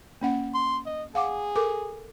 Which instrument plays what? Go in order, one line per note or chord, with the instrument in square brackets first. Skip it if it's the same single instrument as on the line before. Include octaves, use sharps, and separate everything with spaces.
[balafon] A#3 C#4 F#5
[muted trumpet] C6
D#5
[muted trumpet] G#4 [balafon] F5 F#5 D6
[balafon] A4 A#4 D6